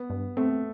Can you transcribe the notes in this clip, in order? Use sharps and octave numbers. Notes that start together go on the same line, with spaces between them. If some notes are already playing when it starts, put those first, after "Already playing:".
Already playing: B3
G2
A3 C4